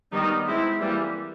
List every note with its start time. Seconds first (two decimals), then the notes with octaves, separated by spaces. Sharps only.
0.12 D#3 G3 B3 D#4
0.45 G#3 C4 E4
0.79 E3 G3 A#3